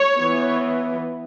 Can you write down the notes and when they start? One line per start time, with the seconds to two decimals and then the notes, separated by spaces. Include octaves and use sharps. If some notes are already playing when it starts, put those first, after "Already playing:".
Already playing: C#5
0.16 E3 B3